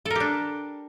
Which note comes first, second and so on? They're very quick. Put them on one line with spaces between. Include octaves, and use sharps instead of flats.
A4 A#4 G4 D4